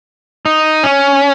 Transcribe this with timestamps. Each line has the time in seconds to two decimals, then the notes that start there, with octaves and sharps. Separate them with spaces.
0.46 D#4
0.83 C#4